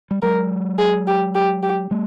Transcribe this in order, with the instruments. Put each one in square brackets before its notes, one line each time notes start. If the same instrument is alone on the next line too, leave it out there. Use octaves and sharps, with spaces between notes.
[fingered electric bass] G3
[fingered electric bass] F#3 G#3 [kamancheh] A#4
[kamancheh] G#4
G4
G4
G4
[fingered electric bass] G3 A3